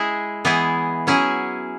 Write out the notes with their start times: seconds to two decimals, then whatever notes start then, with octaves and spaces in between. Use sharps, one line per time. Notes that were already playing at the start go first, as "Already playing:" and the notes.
Already playing: G#3 E4 G#4
0.45 E3 B3 E4 G#4
1.07 F#3 C#4 E4 G#4